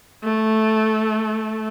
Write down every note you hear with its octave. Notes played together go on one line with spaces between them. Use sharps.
A3